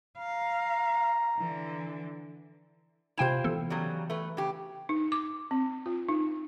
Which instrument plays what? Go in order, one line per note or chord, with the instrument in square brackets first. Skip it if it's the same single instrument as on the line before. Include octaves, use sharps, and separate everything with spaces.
[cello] F5 [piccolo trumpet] A#5
[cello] D3 E3
[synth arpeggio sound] C3 G5 E7 [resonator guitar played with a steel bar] E4 F4 C5
[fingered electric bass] E3 B3 [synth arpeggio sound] A4
[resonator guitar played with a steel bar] C#3 F#3 G3
A3 B4
C#3 G4
[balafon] D#4
D6
C4
F4
D#4